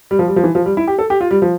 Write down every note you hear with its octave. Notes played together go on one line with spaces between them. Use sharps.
G3
F3
G3
F3
E3
F3
G3
E4
G4
A4
G4
F4
G3
F3